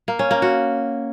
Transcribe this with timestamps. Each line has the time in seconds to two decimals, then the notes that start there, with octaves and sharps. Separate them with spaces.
0.08 A#3
0.19 C#4
0.31 A#3
0.42 F#4